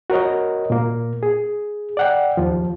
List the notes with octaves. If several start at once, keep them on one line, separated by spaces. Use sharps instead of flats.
F#4 A#4 C#5 D#5
A#2 A#3
G#4
D5 F#5 G5
D#2 F3